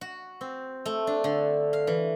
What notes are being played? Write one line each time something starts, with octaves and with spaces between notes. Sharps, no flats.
F#4
C4
A3
D4
D3
F5
E3